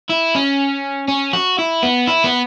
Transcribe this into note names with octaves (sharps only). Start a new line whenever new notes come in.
E4
C#4
C#4
F#4
E4
B3
E4
B3